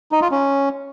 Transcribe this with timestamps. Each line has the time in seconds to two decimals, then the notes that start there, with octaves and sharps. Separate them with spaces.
0.12 D#4
0.22 F4
0.31 C#4